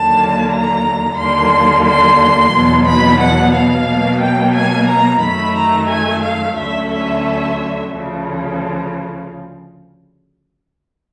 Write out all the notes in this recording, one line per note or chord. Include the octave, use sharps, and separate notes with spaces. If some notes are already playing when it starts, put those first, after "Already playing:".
Already playing: D#2 D3 F#3 A#3 A5
A#5
D#2 D3 G3 A#3 C6
C6
E2 B2 F#3 B3
B5
F#5
F5
B2 F#3 A#3
G5
G#5
A#5
F#2 D#3 F#3 A3 B5
A#5
G#5
F5
D2 D3 F#3 A3 C#4 E5
E5
D2 C#3 F3